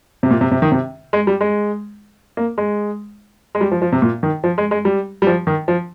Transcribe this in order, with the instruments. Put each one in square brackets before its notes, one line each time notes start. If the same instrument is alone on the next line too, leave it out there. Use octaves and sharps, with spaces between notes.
[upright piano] C3
A#2
C3
C3
D#3
C3
G#3
G3
G#3
A#3
G#3
G#3
G3
F3
F3
C3
A#2
D#3
F3
G#3
G#3
G3
G3
F3
D#3
F3